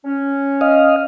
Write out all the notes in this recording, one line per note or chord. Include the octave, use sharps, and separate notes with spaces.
C#4
D#5 F5